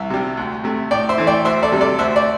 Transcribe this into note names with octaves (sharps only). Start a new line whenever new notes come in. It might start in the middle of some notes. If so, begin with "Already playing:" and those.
Already playing: C2 E5
C3 G3
D2
C3 A3
A2 D5 G5
C5 E5
E3 A3
D5 G5
D2 C5 E5
A4 D5
C3 G3
A4 D5
D2 C5 E5
D5